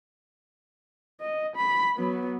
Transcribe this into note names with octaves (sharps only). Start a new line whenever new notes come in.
D#5
B5
F#3 B3